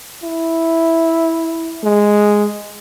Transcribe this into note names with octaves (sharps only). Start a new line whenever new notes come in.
E4
G#3